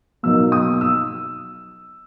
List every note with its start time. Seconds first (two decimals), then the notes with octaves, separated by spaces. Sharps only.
0.23 B2 F#3 A#3 D#4 E6
0.52 D#6
0.81 E6